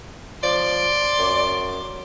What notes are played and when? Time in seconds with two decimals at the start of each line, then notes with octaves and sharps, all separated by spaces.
0.43 F3 D5 C6 D6
1.18 F#2